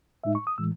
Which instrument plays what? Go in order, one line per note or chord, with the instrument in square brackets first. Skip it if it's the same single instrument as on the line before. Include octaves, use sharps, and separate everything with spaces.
[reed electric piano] A2 G#3 D#4 E5
C#6
D#6
A2 E3 G#3 E6